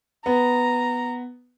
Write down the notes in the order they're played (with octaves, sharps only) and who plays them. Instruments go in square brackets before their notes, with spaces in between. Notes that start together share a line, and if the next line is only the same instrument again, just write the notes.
[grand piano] B3 [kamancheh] A#5